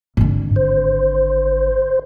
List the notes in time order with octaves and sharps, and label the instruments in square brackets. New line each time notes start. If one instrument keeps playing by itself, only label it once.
[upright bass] G#1 D3 [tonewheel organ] G#2
[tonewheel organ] C5